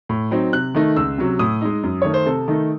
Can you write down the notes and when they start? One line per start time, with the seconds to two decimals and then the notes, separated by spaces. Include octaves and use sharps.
0.09 A2
0.31 F#3 C4 D#4
0.53 C3 F#6
0.75 D#3 A3 D#4
0.96 C#2 E6
1.18 C3 F#3 C#4
1.39 A2 D#6
1.62 G#3 D#4
1.83 F#2
2.02 D#3 A3 C#5
2.14 C5
2.26 C3 A4
2.48 D#3 A3 D#4